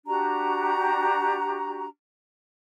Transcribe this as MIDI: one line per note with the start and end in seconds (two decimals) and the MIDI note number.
0.06 1.86 62
0.06 1.86 66
0.06 1.86 67
0.06 1.86 82